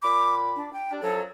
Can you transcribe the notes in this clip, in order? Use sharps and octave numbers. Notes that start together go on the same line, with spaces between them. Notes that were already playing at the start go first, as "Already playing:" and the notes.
A#2 B5 D6
D4
G5
G3 D4
F#2 F3 F#3 A4